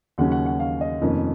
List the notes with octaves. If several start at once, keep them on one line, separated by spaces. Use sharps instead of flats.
D#2 C#3 F#3 C#4 F#5
F#5
F#5
F5
D#5
F1 F2 D#3 A#3 C#4